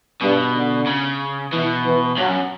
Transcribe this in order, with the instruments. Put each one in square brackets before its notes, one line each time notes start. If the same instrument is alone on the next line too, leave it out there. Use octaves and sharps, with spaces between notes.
[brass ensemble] G2 [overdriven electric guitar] B2
[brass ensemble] D3
[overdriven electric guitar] C#3
[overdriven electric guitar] B2 [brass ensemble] E3
[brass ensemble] E3
[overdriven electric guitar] G2 [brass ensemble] F#3
[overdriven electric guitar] F#2